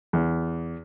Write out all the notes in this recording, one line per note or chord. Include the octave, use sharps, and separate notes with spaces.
E2